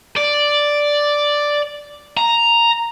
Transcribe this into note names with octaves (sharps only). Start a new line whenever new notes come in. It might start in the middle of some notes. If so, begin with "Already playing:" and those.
D5
A#5